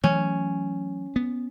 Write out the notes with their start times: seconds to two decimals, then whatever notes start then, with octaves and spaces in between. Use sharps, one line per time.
0.04 E3 F#3 A3 C#4
1.16 B3